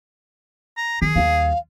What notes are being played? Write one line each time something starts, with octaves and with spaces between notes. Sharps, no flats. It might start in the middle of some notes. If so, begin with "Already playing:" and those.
A#5
D#3 G#4
D#2 G3 F5